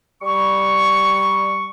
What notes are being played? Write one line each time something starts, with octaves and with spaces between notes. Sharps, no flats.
G3 C#6